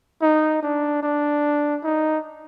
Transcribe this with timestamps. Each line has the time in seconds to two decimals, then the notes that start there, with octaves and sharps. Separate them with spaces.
0.22 D#4
0.63 D4
1.03 D4
1.84 D#4